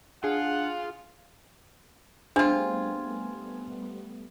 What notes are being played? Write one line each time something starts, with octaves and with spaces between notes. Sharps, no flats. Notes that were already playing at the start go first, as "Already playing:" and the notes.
D4 F4 G#4 F#5
G3 A3 B3 C4 D4 F4 G#4 G#5